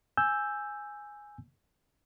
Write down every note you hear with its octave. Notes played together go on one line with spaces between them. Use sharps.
G#5 E6 G6